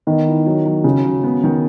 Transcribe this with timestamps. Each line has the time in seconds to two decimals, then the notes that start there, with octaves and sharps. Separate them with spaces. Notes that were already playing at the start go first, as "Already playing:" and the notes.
0.07 D#3 B3
0.27 E4
0.46 F#3
0.66 F#3
0.84 C#3 F#3
1.05 F#3
1.23 B3
1.43 D#3